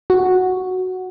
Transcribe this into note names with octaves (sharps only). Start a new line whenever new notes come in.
F#4